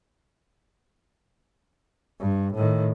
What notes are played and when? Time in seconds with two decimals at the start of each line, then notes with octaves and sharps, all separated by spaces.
2.20 G2
2.55 A2 D#3